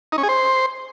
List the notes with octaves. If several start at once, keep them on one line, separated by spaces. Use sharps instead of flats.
D#4
C#4
G#4
C5